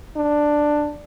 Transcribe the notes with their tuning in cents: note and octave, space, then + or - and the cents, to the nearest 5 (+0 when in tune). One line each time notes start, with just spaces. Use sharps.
D4 +10